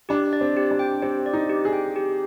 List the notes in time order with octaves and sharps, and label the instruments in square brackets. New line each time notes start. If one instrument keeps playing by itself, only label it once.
[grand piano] D4 [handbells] G4
[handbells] D5
[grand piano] C4
[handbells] G4
[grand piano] D4
[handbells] G5
[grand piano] C4 [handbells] G4
[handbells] D5
[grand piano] D#4
[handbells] G4
[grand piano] G#4
[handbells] G5
G4